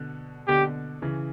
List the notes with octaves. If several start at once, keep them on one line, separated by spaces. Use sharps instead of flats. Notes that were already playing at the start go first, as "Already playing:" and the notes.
Already playing: B2 D3
B2 D3 G4
C#3 E3